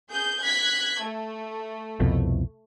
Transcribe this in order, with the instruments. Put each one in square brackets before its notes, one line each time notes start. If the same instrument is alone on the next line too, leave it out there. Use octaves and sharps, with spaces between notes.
[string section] G#4 G6
F#6 G#6 B6
A3
[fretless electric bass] C2 F2 B2